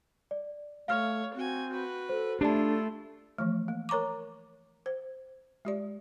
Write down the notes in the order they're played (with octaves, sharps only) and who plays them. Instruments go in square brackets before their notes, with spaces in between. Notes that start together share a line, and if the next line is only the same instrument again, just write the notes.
[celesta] D5
[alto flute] A3 [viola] C#5 [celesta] F5 F6
[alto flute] C4 [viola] F#4 G#5
[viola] F#4 B4
[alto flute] A4 [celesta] C5
[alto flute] A3 [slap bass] D4 [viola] E4 F4 [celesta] G4 D5 A5
[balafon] E3 F3 A3
A#3
A#4 C#5 A#5 C#6 D6
C5
G#3 G4 D5